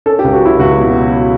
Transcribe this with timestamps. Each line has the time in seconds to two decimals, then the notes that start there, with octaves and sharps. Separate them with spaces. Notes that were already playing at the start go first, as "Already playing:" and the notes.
0.06 C#4 A4
0.19 G4
0.24 C#2
0.33 F#4
0.42 F#3 E4
0.59 C#2 F#4
0.77 B2
0.95 F#3